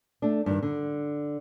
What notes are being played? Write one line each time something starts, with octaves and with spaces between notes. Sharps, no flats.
A3 D4
G2 D#3
D3